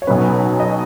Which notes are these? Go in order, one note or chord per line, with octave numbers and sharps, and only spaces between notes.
C#5
B1 B2 F#3 C#4 B4
D#5